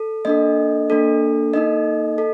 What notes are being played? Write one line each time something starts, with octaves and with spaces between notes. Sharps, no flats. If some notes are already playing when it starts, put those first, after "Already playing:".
Already playing: A4
A#3 D4 A4 D#5
A#3 D4 A4
A#3 D#4 A4 D#5
A4